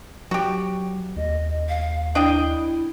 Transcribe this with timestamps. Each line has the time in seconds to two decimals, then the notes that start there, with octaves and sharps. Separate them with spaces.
0.31 F#3 F#4 G4
1.17 D#2 D#5
1.69 F5
2.15 D4 E4 D#5 G5